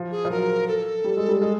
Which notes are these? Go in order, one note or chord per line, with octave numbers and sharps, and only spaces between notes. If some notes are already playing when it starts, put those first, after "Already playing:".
Already playing: F3
G#4
F3
F#3 A#4
A4
G3
G#3
G3
G#3